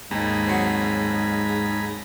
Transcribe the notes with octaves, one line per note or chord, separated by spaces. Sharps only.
D#2 G#2 D#4 G#4 A#5 B5
F#3 C4